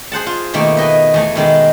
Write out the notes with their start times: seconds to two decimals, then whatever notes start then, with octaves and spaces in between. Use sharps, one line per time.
0.12 G#4 C5 F#5 A5
0.26 F4
0.54 B2 D#3 A3 A#3
0.77 B4 D#5 G#5
1.14 E2 A3 G#5
1.35 B2 D#3 G#3